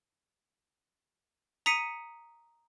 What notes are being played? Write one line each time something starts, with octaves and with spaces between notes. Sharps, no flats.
A#5 D#6 B6 C#7 D#7